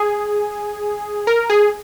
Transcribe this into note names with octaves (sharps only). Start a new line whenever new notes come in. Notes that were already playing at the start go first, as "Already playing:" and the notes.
Already playing: G#4
A#4
G#4